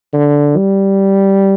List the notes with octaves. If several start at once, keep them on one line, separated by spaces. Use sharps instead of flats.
D3
G3